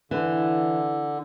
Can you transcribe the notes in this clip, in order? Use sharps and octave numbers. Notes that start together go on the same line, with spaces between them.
D3 E3